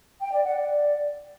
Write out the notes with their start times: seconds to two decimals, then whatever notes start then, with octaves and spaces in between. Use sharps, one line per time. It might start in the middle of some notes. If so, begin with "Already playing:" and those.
0.20 G5
0.32 D5
0.44 F#5
0.56 D5